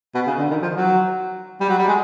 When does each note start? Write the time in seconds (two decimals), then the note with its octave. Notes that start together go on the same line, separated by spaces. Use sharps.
0.14 B2
0.27 C#3
0.38 D3
0.50 D#3
0.62 F3
0.75 F#3
1.60 G3
1.69 F#3
1.78 G3
1.88 G#3